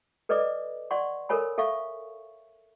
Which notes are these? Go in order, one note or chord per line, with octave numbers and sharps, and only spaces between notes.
A4 B4 D5 D#5 D6
D5 F#5 C6 C#6
A4 A#4 C#5 G#5 B5
A4 E5 F5 C#6